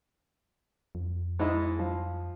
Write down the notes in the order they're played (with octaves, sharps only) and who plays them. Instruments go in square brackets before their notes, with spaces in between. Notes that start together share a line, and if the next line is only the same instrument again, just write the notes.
[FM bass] F2
[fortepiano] G#2 E4 D#5
F3